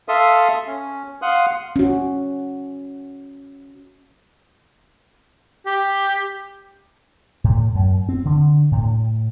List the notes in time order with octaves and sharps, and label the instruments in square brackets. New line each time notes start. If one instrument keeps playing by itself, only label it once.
[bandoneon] A4 E5 F5 C6 D#6
C#4
F5 F#5 C6 D#6 F#6
[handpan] C#4 F#4
[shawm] G4
[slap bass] A2
F#2
C4
D3
A2